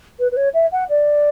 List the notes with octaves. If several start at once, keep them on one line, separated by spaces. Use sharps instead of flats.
B4
B4
C#5
E5
F#5
D5